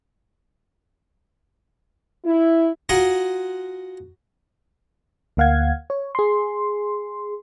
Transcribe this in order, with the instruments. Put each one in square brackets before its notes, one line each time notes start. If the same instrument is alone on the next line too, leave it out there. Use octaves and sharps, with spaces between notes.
[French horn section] E4
[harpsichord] F4 F#4 G#4 F#5 A#5 C6
[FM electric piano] D2 A#3 F5 F#5 G#6
C#5
G#4 C6